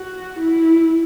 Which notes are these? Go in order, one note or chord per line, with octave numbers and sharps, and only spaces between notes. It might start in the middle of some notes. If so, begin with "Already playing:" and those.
Already playing: F#4
E4